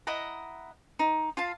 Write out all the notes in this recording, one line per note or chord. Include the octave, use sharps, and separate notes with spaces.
E4 D#5 F#5 A#5
D#4
F4 F5 A5